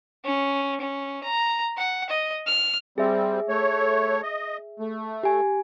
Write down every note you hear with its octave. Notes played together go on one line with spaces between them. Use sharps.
C#4
C#4
A#5
F#5
D#5
F6
G3 C4 G#4 E5
A3 C#5
D#5
A3
G4 G#5